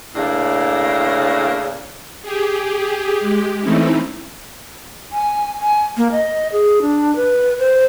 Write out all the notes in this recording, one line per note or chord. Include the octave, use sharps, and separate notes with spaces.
A2 C#3 A#3 D4
G4 G#4
G#3 G4
E3 A3 C4 C#4 D#4 E4
G#5
G#5
A#3
D#5
G#4
D4
B4
C5